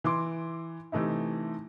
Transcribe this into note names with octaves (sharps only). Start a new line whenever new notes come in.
E3 C6 D6
C3 E3 A3 D#4 E4